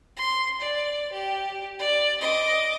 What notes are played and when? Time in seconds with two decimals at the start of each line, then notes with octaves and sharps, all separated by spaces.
0.17 C6
0.60 D5
1.12 G4
1.79 D5
2.20 D#5 D6